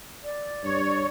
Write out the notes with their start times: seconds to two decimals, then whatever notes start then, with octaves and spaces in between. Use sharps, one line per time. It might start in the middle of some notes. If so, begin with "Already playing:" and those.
0.24 D5
0.64 G2 C#5